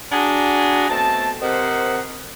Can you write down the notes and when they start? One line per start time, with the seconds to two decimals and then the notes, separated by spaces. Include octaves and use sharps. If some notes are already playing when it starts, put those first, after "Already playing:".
0.11 D4 F#4 G#4 F#5 G#5 A#5
0.89 B2 A3 C4 A5
1.41 C3 A#4 C5 D#5 F#5